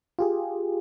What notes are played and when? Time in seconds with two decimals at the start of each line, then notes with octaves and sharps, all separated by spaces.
0.19 F4 G4 G#4